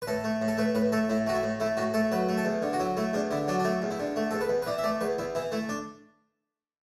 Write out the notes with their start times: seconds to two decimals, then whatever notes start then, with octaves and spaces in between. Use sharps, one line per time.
0.02 B4
0.07 A2 A4
0.24 A3
0.42 A2
0.48 A4
0.57 A3 B4
0.75 A2 B4
0.92 A3 A4
1.09 A2 E4
1.27 A3 F#4
1.35 E4
1.43 A2
1.60 A3 E4
1.77 A2 F#4
1.94 A3 A4
2.12 F#3 B4
2.29 A3
2.38 A4
2.45 E2
2.62 D3
2.73 F#4
2.80 F#3 E4
2.97 A3 E4
3.13 E2 D4
3.31 D3 E4
3.48 F#3 D4
3.59 D4
3.64 A3 E4
3.82 E2
3.91 E4
4.00 D3
4.16 A3
4.31 E2 A4
4.41 B4
4.50 E2
4.62 B4
4.67 E3 D5
4.78 E5
4.84 A3 D5
5.01 E2 B4
5.18 E2 E4
5.35 E3 E4
5.52 A3 E4
5.69 D4